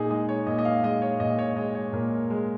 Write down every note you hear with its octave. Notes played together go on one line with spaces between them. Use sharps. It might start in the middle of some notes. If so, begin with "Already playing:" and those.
Already playing: A#2 D#4 G#4
G#3 D#5
C#5
A#2 D#5
D#5
F5
G#3 D#5
C#5
A#2 D#5
C#5
G#3 D#5
C#5
A#2 A#4
G#3